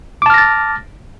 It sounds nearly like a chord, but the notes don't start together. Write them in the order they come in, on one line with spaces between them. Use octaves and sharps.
D6 A5 F6 A#6 A6